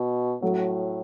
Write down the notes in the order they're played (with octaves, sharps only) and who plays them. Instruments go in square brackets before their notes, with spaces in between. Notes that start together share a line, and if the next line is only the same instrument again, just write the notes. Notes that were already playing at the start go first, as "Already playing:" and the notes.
Already playing: [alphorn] B2
[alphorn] A2 [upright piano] F#3 A3